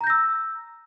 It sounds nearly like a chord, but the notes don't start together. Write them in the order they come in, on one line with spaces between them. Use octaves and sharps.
A#5 G6 A#6 E6